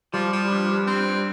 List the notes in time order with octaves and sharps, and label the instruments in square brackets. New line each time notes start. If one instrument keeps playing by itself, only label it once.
[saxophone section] F3 [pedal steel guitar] G3
[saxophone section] F3
G2
G2
C4
G2